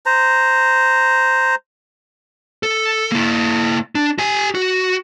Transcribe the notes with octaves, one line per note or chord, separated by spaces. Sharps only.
C5 A#5
A4
A#3 E4
D4
G4 G#5
F#4